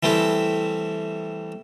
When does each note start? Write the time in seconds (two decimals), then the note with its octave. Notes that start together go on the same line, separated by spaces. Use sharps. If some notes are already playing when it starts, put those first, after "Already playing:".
0.03 E3 G3 A3 C4 E4